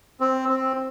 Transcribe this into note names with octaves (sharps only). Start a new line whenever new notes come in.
C4
C4